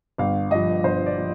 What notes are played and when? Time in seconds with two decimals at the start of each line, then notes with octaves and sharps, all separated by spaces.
0.18 G1 F5
0.51 G2 F3 D#5
0.84 G1 C5
1.06 D5
1.18 F3